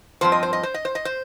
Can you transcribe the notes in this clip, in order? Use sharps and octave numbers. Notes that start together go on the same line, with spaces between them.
G2 F3 C4 C5
D#5
C5
D#5
C5
D#5
C5
D#5
C5